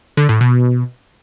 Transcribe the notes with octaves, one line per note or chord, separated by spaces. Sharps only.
D3
A2
B2